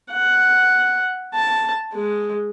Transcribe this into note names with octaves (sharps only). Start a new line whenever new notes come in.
F#5
A5
G#3